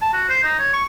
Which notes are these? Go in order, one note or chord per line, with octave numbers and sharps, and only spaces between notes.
A5
F#4
C5
D#4
C#5
C#6